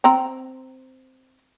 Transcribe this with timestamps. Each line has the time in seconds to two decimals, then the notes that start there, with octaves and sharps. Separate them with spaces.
0.04 C4 G5 A#5